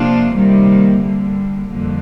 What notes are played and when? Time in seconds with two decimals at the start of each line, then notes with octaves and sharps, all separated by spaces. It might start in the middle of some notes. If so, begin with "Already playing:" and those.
Already playing: C3 F3 A#3 D4 F4
0.32 C3 D#3 G3 A#3
1.00 D3 G3 A#3
1.69 F2 D3 G3 A#3